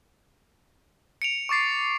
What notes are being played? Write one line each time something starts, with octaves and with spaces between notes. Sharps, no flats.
C#7 D7 F7
C#6 D6 A6 C7